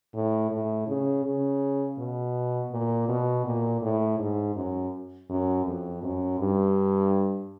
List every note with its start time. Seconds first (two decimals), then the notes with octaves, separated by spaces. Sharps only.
0.14 A2
0.51 A2
0.88 C#3
1.24 C#3
1.98 B2
2.71 A#2
3.08 B2
3.45 A#2
3.81 A2
4.19 G#2
4.56 F#2
5.30 F#2
5.65 F2
6.03 F#2
6.39 G2